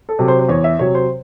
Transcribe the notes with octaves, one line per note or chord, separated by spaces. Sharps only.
A4
C3 F#3
C5
C5
E2 C#5
E5
C3 F#3 C#5
C5